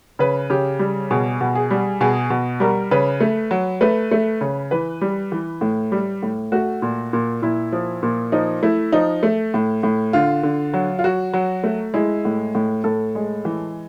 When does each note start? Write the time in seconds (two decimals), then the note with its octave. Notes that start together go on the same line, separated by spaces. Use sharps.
0.19 C#3 B4
0.50 C#3 G4
0.79 G3
1.11 B2 G#4
1.41 B2
1.55 G#4
1.71 G3
2.01 B2 G#4
2.30 B2
2.60 G3 A#4
2.91 C#3 B4
3.20 A3
3.51 F#3
3.81 A3 B4
4.11 A3
4.41 C#3
4.71 E3 B4
5.01 G3
5.32 E3
5.61 A2
5.92 G3
6.22 A2
6.52 A3 F#4
6.82 A#2
7.13 A#2
7.42 A#2 E4
7.73 F3
8.03 A#2
8.32 F3 D#4
8.63 A3 E4
8.92 F3 D#4
9.23 A3
9.54 A2
9.83 A2
10.13 D3 F4
10.43 D3
10.74 F#3
10.99 F4
11.04 F#3 F#4
11.33 F#3
11.64 A3
11.94 G#3 E4
12.25 A2
12.55 A2
12.84 A2 A4
13.15 G#3
13.45 E3